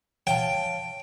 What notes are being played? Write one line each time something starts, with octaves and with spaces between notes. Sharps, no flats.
C#5 F5 G5 A5